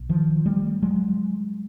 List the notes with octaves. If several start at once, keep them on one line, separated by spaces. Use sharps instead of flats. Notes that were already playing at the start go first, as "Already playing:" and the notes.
Already playing: B1
D#3 F3
G3 A3
F#3 G#3